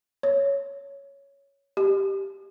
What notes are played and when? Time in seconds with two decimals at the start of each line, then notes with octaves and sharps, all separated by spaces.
0.23 C#5
1.77 G4